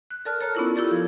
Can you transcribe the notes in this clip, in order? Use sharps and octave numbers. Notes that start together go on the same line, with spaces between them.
F#6
A4 A#4 D5 A5 F6 F#6
A4 C#5 A#5 F6
B3 C#4 D4 E4 F4 A#4
E4 F4 G4 A4 D5
F3 G#6